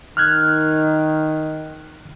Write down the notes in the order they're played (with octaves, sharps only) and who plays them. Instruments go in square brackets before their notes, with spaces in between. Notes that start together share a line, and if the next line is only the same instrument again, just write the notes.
[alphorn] D#3 [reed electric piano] F6 F#6 G#6